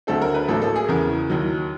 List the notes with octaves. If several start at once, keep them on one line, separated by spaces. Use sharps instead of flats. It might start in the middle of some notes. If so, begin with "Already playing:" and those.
D2 D3 F#3 A3 C4 A4
A#4
B4
A1 A2 F#3 A#3 A4
A4
G#4
E2 C#3 E3 A#4
D#2 D#3 F#3